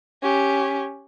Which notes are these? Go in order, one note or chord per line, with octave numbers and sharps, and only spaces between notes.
C#4 G4